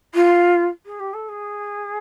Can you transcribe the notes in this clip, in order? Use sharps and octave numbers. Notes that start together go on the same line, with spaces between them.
F4
G#4
G4
A4
G#4